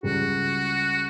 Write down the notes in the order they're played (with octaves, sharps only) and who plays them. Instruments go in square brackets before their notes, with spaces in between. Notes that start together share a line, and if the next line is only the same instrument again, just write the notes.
[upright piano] C#2 C#3 G3 [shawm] F#4